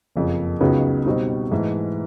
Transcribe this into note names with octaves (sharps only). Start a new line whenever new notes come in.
F#1 F2 C#3
C#2 C#3 F#3 B3 D#4
B2 G3 C4 D#4
G#2 E3 A3